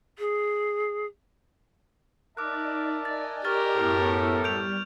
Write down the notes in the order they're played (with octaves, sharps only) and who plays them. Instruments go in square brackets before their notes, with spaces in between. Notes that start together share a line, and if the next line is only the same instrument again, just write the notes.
[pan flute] G#4
[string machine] D#4 D5 [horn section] A#4 E5 A5 [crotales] D6 F#6
[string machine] D5 D#5 G#5 [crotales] A6
[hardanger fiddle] G4 A#4 [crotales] C#6 F6 A6
[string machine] F#2 B3 E4 [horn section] A2 A4
[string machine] G3 [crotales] G6 D7 F7